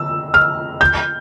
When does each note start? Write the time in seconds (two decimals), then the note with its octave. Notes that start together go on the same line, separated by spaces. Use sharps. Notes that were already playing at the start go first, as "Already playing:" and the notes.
Already playing: E6
0.34 F6
0.81 G6